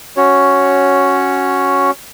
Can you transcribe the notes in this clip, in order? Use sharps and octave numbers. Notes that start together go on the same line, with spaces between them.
C#4 F#4 C#5